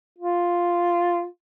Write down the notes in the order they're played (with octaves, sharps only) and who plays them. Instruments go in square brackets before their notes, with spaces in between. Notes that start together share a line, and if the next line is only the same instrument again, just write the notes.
[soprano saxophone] F4